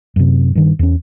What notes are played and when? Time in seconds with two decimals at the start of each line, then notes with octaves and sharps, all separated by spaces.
0.16 F#2 C3
0.55 G2 D#3
0.79 E2 C#4